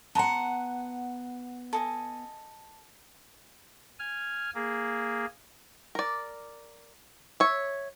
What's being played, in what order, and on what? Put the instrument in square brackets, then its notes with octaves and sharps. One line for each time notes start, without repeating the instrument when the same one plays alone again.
[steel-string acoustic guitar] B3 F#5 [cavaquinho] A5 A#5 C6
[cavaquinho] A4 D#5 G#5
[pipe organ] G#5 F6
A#3 G#4
[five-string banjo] A#4 D5
C#5 E5